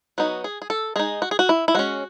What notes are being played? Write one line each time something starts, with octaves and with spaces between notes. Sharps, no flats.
F#3 B3 D#4 F#4
G#4
G#4
A4
G#3 D#4 G#4
F#4
G#4
F#4
E4
E4
G#3 C#4 F#4